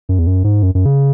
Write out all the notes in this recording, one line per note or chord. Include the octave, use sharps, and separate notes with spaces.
F#2
E2
F#2
G#2
F#2
F#2
C#3